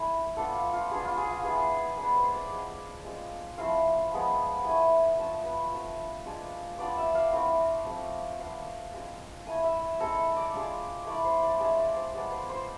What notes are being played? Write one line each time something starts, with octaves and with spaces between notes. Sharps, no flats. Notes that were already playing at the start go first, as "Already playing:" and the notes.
Already playing: A3 E4 G#5
B3 D4 F4 A4
F4
F4
B3 D4 F4 G#4
F4
G#4
F4
B3 E4 G#4
G#3 B3 D4 B4
C5
D5
G#3 C4 F4
G#3 C4 F4
F3 A3 C4 E4 F5
F3 G#3 B3
A3 E4 G#5
F3 A3 D4 F4 A5
B4
A3 C4 F4
G#3 D4 F4
B3 D4 F4 D5
E5
F5
A3 C4 E4
F3 A3 C4
B3 F4 F5
G#3 C4 F4
A3 E4 G#5
E5
G#3 C4 E4 A4
D5
G#3 D4 F4
A3 E4 D5
C5
D5
G#3 D4 F4 E5
D5
C5
F3 G#3 B3 D5
C5
C5